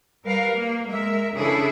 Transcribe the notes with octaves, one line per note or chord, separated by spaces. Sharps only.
G3 A#4 B4 F5
A#3
G#3 A#4 E5
C#3 E3 D4 E4 G#4 A4